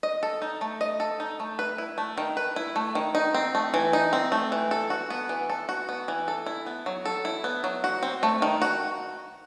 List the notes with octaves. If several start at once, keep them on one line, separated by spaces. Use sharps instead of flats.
D#5
A4
D#4
A3
D#5
A4
D#4
A3
B4
E4
A3
D#3
B4
E4
A3
D#3
D#4
C4
A3
E3
D#4
C4
A3
E3
A4
F#4
B3
E3
A4
F#4
B3
E3
A4
E4
B3
F#3
A4
E4
B3
F#3
F#4
C4
A3
D#3
F#4